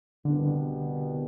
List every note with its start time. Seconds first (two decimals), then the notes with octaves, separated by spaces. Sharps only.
0.25 C2 B2 D3 G3 B3